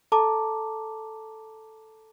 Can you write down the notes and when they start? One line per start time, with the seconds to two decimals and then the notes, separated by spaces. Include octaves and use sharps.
0.12 A4 A5 A#5 D6